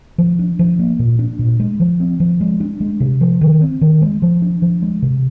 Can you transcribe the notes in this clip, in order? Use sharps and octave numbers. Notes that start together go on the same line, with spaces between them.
F3
D4
F3
A#3
A#2
D4
A#2
G#3
F3
C4
F3
G#3
D4
G#3
C3
F3
D#3
C4
D#3
G#3
F3
D4
F3
G#3
C3